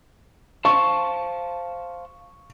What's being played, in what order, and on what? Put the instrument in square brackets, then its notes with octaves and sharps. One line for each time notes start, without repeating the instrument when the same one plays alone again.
[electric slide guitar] C5 F5 A5 [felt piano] C#6